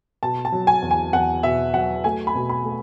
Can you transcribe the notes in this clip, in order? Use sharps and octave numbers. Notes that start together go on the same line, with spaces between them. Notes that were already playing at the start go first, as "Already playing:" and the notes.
B2 A5
A5
F#3
G#5
E2
G#5
E2 F#5
B2 E5
F#3 F#5
A3 G#5
B5
B2
B5
A3